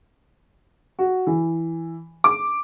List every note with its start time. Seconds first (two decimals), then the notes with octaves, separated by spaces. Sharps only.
0.99 F#4
1.27 E3
2.24 D6